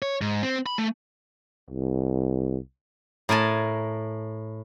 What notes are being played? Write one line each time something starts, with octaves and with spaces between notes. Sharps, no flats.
C#5
G#2
C4
B5
A3
C2
A2 A#4 G#5 A5